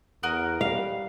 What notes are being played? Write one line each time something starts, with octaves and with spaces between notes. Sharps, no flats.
E2 F#4 A#4 D#6
G3 F5